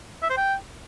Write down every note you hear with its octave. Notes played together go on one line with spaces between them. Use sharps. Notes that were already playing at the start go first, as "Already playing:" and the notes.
E5
C5
G5